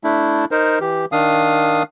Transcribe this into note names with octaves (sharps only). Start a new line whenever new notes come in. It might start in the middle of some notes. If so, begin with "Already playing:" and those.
A3 D4 E4
D#4 A#4 C5
E3 G4
D#3 D4 F5 D#6